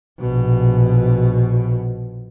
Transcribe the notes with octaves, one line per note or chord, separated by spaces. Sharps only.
A#1 B2